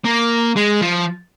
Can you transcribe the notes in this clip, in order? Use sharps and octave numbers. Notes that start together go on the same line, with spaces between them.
A#3
G#3
F3